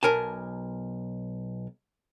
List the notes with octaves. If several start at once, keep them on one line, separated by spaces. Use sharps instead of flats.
B1 A#4 G#5 A5